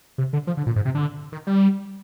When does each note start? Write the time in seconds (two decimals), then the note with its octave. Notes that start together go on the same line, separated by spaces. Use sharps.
0.18 C3
0.33 D3
0.47 F3
0.57 D3
0.66 A#2
0.76 G#2
0.85 C3
0.95 D3
1.32 D#3
1.47 G3